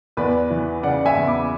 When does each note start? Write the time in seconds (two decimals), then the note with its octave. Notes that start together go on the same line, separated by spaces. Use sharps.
0.17 E2 B4 D5
0.50 E3
0.83 C#3 D5 F#5
1.06 E5 G#5
1.16 E2
1.27 B5 D6